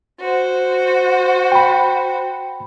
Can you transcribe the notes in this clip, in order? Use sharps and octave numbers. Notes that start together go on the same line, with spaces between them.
F#4 C5
G5 B5